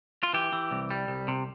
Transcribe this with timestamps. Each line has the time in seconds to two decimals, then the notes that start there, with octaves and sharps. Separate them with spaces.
0.23 F4
0.33 E3 G4
0.53 E3
0.71 C2
0.91 G3
1.08 C2
1.28 C3